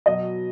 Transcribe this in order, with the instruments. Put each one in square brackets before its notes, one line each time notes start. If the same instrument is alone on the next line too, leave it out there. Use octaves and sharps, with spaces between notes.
[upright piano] B2 F#3 D#5